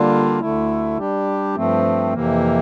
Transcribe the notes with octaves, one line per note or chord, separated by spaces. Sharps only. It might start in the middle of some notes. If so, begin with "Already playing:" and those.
Already playing: D3 G3 A#3 D4 F4
D2 D3 A3 E4
G3 D4 G4
G2 F3 A3 C4
F2 C3 E3 A#3